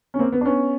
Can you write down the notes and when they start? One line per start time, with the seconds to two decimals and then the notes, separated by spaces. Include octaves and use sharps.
0.14 C#4
0.19 A#3 C4
0.33 B3
0.41 D4
0.45 B3 C#4